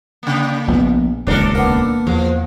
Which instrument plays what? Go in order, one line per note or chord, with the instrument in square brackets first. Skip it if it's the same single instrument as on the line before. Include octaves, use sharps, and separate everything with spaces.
[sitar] C#3 A#3
[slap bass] A#1 B3
[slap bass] D#1 C#2 [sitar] D4 A4 A#4
[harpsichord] A#3 B3
[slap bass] E2 [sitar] F3